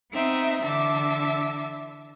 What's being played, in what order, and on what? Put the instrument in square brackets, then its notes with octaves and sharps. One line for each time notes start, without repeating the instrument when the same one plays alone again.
[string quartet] B3 C4 D#4 E5
D3 E3 E5 A5 D6